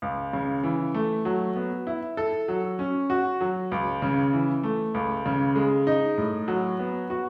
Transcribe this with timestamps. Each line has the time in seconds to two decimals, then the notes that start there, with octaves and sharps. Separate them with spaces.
0.02 C#2
0.33 C#3
0.63 E3
0.94 A3
1.25 F#3
1.56 B3
1.87 E4
2.17 A4
2.48 F#3
2.79 C#4
3.10 F#4
3.41 F#3
3.71 C#2
4.02 C#3
4.33 E3
4.63 A3
4.94 C#2
5.26 C#3
5.56 G#3
5.87 D#4
6.18 A2
6.48 F#3
6.79 B3
7.10 F#4